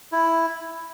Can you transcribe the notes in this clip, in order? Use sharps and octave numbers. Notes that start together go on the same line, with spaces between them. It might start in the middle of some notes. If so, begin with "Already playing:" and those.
E4